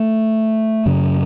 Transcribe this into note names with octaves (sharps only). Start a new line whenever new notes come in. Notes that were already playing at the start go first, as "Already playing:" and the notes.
Already playing: A3
F#2 C#3